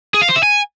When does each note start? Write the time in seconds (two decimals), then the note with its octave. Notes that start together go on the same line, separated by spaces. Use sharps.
0.14 G#4
0.21 F5
0.29 C5
0.36 E5
0.43 G#5